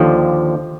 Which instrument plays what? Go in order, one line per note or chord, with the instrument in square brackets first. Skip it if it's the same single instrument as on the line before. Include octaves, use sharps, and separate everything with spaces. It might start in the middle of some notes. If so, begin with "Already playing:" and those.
Already playing: [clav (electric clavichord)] D#2 D3 F3